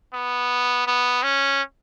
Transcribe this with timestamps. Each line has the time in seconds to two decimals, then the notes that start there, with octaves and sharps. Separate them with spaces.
0.14 B3
0.87 B3
1.23 C#4